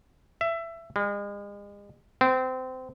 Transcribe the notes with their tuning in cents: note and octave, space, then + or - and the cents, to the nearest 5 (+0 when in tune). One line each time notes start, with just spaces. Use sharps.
E5 +20
G#3 -40
C4 -25